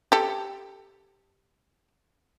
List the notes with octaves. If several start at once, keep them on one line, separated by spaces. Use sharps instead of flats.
G4 A4